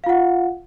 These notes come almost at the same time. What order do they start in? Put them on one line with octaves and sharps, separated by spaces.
F5 F4 F#5